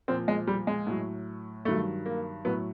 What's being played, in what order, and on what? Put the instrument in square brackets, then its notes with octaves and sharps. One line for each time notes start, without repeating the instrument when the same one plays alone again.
[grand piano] A#2 F3 C4
G#3
G3
G#3
A2 F#3
G2 D#3 F#3 A3
A#3
A2 F#3 B3